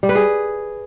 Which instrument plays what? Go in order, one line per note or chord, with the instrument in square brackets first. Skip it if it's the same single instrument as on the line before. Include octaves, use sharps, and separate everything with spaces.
[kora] G3
B4
G#4